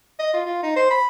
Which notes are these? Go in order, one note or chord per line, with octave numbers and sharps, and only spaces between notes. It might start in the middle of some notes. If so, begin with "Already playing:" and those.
D#5
F4
F4
D#4
C5
B5